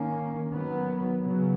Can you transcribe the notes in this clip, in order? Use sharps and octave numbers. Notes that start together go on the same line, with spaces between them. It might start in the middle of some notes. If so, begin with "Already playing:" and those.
Already playing: D#3 A#3 C#4
D#3 F#3 B3
C#3 F#3 B3